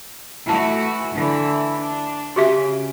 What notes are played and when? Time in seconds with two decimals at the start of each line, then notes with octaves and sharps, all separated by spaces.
0.49 E3 A3 F#4 A5
1.16 D3 E3 E4
1.80 D4
2.36 C#3 F#4 G4 E5